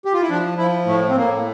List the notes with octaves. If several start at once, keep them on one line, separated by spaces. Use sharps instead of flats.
G4
F4
E4
F3 D4
F3 E4
A2 A3
C4
A2 A#3